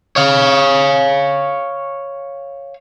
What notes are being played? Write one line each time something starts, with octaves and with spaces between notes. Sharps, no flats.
C#5 F5